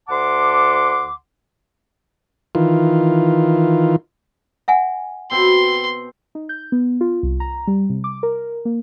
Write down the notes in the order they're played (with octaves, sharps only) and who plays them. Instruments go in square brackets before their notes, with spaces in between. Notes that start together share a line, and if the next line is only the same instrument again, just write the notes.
[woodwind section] D2 F#5 A5 C6 D6
[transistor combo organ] D#3 E3 F4
[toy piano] E5 F#5 G#5
[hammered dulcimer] B2 C4 [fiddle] C6
[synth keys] D#4
G6
B3
F4
C2
A#5
G3
C3
D6
A#4
A#3